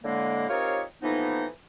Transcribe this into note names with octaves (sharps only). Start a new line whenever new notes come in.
A2 D3 G#3 A#3
C4 D#4 F4 G4 A#4 C#5
A2 E3 F3 A#3 B3 D#4